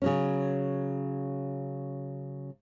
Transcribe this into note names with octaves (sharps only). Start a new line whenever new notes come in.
C#3 F#3 C#4